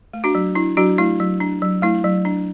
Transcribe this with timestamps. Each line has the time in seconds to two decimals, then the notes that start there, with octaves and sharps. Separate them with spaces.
0.13 A3
0.24 D4 F#4
0.35 F#3
0.55 D4 E4
0.77 F#3 D4 F#4
0.98 A3 E4
1.20 F#3
1.40 D4
1.62 F#3
1.82 A3 E4
2.04 F#3
2.25 D4